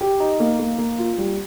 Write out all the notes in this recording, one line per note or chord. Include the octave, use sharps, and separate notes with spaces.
G4
D#4
A#3
A#3
A#3
F4
G3